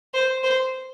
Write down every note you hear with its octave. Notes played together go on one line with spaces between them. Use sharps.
C5
C5